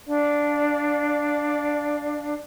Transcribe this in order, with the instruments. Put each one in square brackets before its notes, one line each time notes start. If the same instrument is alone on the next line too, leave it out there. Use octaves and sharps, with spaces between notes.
[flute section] D4 D5 F5